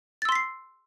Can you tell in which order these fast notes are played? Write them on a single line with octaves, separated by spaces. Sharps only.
A6 E6 C6 B6 C7